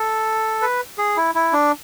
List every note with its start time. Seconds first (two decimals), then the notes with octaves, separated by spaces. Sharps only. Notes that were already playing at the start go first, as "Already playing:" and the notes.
Already playing: A4
0.62 B4
0.98 G#4
1.17 E4
1.35 E4
1.53 D4